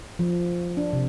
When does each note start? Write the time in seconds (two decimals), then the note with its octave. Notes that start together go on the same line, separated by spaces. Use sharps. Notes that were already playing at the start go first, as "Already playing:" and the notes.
0.19 F3
0.77 D4
0.93 C3